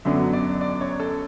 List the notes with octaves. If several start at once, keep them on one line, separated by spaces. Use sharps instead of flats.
F#2 D3 F#3 B3 D4 E5
D5
D5
C#5
A4